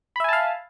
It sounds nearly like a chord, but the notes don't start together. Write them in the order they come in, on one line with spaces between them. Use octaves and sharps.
B5 E5 G#5 A5 F5